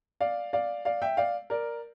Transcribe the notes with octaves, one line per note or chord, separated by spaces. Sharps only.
D5 F5
D5 F5
D5 F5
E5 G5
D5 F5
A#4 D5